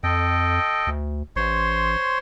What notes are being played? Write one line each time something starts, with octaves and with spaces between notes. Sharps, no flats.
F2 A4 D#5 G5
D2
A1 C5 C#5 C6